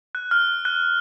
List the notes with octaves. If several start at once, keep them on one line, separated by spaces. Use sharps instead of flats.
F#6
F6
F#6